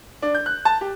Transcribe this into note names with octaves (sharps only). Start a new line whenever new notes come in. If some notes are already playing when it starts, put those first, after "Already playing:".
D4
G6
F#6
A5
G4